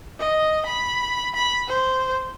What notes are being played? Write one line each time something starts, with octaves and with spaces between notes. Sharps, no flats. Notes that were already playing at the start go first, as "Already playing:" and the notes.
D#5
B5
B5
C5